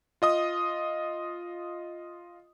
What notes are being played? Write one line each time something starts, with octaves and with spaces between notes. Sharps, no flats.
F4 D#5 D#6